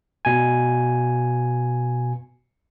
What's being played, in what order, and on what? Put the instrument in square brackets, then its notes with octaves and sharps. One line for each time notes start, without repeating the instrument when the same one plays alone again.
[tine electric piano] B2 G#5